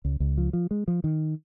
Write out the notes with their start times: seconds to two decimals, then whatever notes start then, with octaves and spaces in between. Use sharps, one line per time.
0.05 C#2
0.20 C#2
0.38 F3
0.53 F3
0.71 G#3
0.88 F3
1.04 D#3